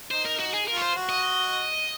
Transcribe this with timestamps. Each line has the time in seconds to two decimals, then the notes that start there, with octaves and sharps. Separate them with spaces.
0.11 D#4 C5
0.25 A#4
0.39 F#4
0.53 G#4
0.67 F4 A#4
0.77 C#5
0.82 C5
0.95 F#4
1.09 D#5